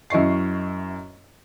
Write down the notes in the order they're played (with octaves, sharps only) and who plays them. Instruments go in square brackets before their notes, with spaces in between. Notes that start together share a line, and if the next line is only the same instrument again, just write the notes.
[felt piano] F#2 E4 D#5 C#6 C7